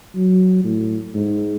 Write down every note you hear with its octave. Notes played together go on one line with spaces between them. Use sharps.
F#3
A2
G#2